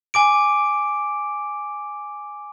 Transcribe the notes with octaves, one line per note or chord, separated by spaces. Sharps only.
G#5 D6 D7